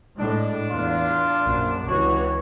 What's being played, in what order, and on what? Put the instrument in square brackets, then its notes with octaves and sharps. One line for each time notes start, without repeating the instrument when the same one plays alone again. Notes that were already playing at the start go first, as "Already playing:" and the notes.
[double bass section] A2 G#3 [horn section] D4
[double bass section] E2 [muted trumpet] F4
[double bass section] A#1 F#2
[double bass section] C#2 E3 [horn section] C3 D4 F#4 [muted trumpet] C#5